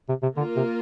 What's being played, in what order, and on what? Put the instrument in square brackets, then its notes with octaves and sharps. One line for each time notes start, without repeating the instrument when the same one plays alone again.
[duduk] C3
C3
[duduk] D3 [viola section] A#3 F4 A#4
[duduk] C3